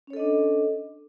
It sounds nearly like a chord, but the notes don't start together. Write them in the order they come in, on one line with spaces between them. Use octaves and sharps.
C#4 C#5 A4 D#5 D4